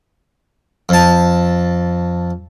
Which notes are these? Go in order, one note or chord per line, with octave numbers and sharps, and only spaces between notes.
F2 A5